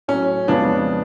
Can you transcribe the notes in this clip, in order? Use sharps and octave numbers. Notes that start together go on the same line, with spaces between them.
A2 F#3 C#4
F2 C#3 F3 G#3 B3 D4